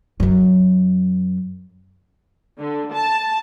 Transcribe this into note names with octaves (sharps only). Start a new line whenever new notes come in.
F#2 F#3
D3
A5